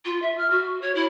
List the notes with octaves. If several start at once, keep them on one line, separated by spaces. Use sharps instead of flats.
F4
E5
F6
F#4
C#5
E4